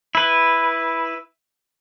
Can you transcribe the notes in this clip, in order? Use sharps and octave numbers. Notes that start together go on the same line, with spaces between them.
E4 B4